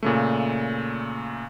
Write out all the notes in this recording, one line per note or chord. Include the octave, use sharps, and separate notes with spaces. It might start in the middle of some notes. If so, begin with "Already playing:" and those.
A#2 C#3 A3